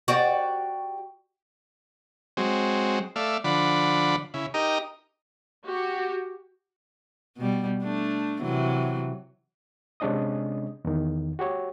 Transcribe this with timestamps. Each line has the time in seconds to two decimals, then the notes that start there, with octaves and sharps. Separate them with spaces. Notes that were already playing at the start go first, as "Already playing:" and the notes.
0.08 F#4 G4 D5
2.37 F#3 G#3 C4
3.16 A3 D5 E5 F5
3.44 D3 F3 D5 F#5 B5
4.34 C#3 E4
4.54 D#4 G4 A#4 D#5 A#5
5.66 F#4 G4
7.37 B2 G3
7.83 A3 D4
8.41 C3 E3 F#3
10.00 C3 G#3 C#4 D4 D#5 D#6
10.85 E2 D#3
11.39 F#4 G4 C#5